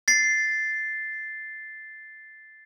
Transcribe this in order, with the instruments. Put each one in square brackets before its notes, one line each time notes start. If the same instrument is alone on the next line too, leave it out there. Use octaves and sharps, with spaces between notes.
[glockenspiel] A6 C7